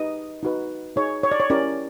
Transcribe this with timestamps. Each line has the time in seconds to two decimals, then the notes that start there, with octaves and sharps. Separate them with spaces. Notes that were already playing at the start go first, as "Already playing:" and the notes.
Already playing: D#4 G4 B4 D#5
0.43 D#4 F#4 B4
0.96 D#4 G#4 C#5
1.23 C#5
1.32 D5
1.40 C#5
1.50 C#4 E4 G4 A#4 C#5 D5